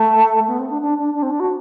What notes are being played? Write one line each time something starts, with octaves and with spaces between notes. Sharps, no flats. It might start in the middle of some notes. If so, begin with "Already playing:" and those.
Already playing: A3
B3
C4
D4
D4
D4
D4
C4
D4
F#4